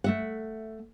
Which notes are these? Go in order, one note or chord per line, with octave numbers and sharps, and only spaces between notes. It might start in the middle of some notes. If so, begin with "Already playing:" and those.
A3 E5 F#5